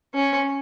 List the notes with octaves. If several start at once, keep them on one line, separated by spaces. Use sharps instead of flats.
C#4